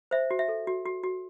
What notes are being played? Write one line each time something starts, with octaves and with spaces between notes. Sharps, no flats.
C5 E5
F#4
E5
A4
F#4
F#4
F#4